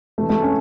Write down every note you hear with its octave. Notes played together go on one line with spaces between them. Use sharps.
C3 E3 A3
A3
C#4